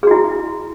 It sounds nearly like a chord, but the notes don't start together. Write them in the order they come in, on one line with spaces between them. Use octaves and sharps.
G#4 F#4 E4